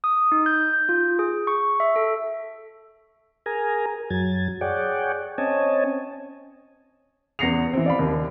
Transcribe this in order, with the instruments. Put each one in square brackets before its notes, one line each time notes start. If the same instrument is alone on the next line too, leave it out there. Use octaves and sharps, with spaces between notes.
[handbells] D#6
D#4
G6
G6
F4
G#4
C#6
E5
A4
[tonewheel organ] G#4 A#4 G#5 A#5
F#2 F#3 G#6 A6
G#4 C#5 D5 F#5 G5
C4 C#4 C#5 D#5 G#5 A5
[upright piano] E2 B3 A#6 C7 C#7 F7
E3 C4
D5 F5 B5
D#2